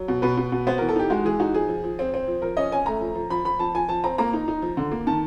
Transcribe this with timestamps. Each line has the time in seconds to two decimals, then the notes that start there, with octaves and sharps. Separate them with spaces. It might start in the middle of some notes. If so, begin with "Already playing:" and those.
Already playing: F#3
0.08 B2
0.22 B2 B4
0.37 B2
0.52 B2
0.67 B3 C5
0.78 E3 A#4
0.89 A4
0.96 D#4 G4
1.10 G#3 F#4
1.25 E3 G#4
1.40 D#4 F#4
1.54 F3 G#4
1.69 F3
1.84 F3
1.99 C4
2.14 C4
2.28 F3
2.42 F3 A#4
2.57 C#4 D#5
2.71 C#4 G#5
2.86 A3 A#5
3.01 F3
3.15 F3
3.30 F3 B5
3.45 F3 B5
3.59 F3 A5
3.75 F3 G#5
3.89 F3 A5
4.04 C4 A#5
4.18 A#3 A#5
4.33 D#4
4.48 D#4
4.62 F3
4.77 D3
4.92 A#3
5.07 D#3 A5